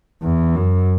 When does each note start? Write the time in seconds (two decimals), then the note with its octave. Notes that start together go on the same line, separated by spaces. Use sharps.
0.23 E2
0.56 F#2